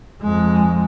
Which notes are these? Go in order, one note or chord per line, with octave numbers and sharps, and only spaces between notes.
F2 G#3